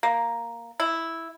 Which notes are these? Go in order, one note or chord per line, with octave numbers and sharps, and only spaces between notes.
A#3
E4